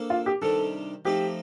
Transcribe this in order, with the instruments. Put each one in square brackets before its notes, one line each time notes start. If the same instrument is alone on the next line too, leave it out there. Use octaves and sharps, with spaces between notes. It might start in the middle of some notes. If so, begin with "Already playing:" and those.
Already playing: [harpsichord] A#3 D4 A4 C5
[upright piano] F4
G4
[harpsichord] C3 D#3 G3 D4 [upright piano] A4
[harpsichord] F3 A3 C4 D#4 [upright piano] G4